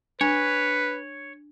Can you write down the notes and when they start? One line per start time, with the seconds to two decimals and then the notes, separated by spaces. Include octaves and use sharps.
0.21 D4 B4 C#5